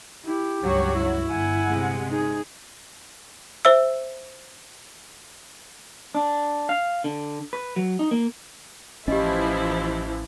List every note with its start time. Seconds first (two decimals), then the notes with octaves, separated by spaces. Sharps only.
0.24 E4 G4
0.63 C#2 G2 F#3 F#4 C#5
0.95 E4
1.30 G1 F#5 G#5
1.67 C3 G#3
2.09 D#4 G#4
3.65 C5 E5 E6
6.15 D4
6.69 F5
7.04 D3
7.53 B4
7.76 F#3
7.99 D#4
8.11 A#3
9.08 A1 E3 F3 C#4 E4 G4 D#5